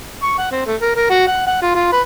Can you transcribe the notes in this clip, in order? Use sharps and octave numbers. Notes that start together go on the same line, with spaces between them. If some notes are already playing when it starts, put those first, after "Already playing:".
C#6
F#5
C4
A3
A#4
A#4
F#4
F#5
F#5
F4
F4
B4